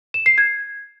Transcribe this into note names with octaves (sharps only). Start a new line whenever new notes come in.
E7
C7
G#6